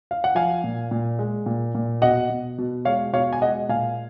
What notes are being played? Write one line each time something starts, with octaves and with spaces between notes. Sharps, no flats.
F5
F#5
F3 F5 G#5
A#2
A#2
G#3
A#2
A#2
B2 D#5 F#5
B2
B2
G#3 C#5 F5
B2 C#5 F5
G#5
G#3 D#5 F#5
A#2 F5 G#5